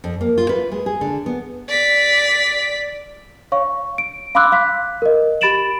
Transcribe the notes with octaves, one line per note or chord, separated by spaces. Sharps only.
F2
A#3
F4
B4
G#3
G#4
D3
B3
D5 B6
C#5 F5 C#6
D7
F5 B5 C6 D6 E6 F#6
F5 F#6 B6
A#4 D#5
G4 B5 A6 D7 E7 F#7